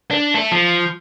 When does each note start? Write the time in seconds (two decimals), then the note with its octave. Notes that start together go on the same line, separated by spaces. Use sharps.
0.11 D4
0.34 A3 A4
0.52 F3